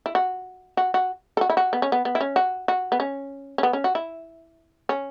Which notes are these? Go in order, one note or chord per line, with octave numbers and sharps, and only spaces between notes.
E4
F#4
F#4
F#4
A4
F#4
E4
F#4
B3
C#4
B3
B3
E4
C#4
F#4
F#4
B3
C#4
C#4
B3
C#4
F#4
E4
C#4